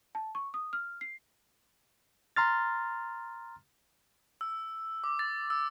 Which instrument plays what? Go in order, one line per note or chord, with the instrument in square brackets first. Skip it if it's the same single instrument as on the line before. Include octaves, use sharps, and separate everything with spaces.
[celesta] A5
C#6
D#6
F6
C7
[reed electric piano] A#5 C6 F6 A6
[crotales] E6
D6
A6
E6